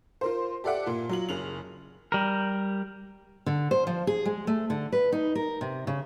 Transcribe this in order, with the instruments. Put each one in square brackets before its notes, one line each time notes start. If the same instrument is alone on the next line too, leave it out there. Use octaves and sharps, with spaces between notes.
[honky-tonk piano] F4 A#4 C5
G4 A4 D5 E5 F#5 D6
A#2 F4
F#3 F4 F#7
F#1 C#3 F7 F#7
[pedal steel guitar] G3 A#4
[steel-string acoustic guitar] D3
C5
F3
G#4
G#3
A3
D3
B4
D#4
A#4
C3
C#3